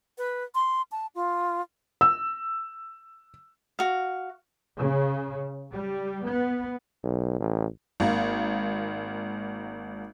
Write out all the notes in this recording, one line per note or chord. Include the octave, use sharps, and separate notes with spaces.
B4
C6
A5
F4
E6
F#4 F5
C#3
G3
B3
B1
A1
G#1 A#3